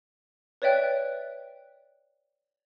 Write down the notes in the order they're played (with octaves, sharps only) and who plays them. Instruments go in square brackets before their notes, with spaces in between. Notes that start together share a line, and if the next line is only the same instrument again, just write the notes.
[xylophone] B4 C#5 D5 E5 G5 F#6